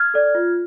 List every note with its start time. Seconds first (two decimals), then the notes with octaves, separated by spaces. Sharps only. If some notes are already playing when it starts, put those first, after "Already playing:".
Already playing: F6 G#6
0.14 A4 D5
0.35 F4